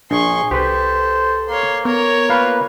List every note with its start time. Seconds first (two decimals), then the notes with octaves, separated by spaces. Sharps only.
0.11 A#1 D4 G#4 C6 C#6
0.51 C2 G4 A4 B4 C5
1.50 A#3 C#5 C6
1.85 B3 A#4 C#5
2.30 A#3 F4 B4 F5